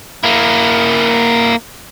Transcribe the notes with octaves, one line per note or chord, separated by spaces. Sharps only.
A#3 E4